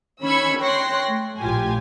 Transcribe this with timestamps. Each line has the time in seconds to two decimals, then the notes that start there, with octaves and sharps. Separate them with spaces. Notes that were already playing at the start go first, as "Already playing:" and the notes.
0.22 D#3 C#4 B5 E6 G#6 C#7
0.60 C#5 G5 C6 F#6 A#6 C7
1.09 A3
1.39 A#1 A2 F4 G4 G#5